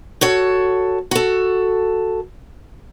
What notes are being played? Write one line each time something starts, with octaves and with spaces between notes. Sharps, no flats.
F#4 A4 C#5
F#4 A4